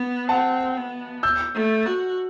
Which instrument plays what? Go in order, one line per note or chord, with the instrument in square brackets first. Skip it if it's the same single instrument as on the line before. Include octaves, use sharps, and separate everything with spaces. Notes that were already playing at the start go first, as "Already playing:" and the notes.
Already playing: [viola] B3
[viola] C4 [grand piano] F#5 A5
[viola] B3
[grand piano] E6 G6
[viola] A3
F#4